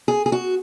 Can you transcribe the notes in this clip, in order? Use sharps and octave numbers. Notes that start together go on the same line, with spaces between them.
G#4
G#4
F#4